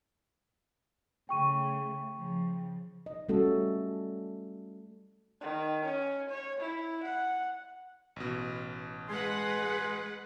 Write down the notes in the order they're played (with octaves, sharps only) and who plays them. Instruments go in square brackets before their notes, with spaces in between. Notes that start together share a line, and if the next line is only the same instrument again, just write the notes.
[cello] C#3 A3 [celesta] G5 C#6 D#7
[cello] C#3 F3
[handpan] D#5
G3 A3 C#4 F#4 A4
[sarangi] D#3
C#4
C#5
E4
F#5
[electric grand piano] A1 B2
[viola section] G#3 B4 F#5 [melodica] G#4 C6